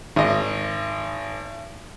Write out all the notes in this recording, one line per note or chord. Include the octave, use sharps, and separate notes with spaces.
G#1 D#5